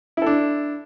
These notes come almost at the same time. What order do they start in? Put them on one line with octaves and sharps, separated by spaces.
E4 A4 D4